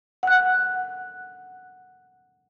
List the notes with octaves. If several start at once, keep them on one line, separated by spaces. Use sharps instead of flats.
F#5 F#6